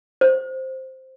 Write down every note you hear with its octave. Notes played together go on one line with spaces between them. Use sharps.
C5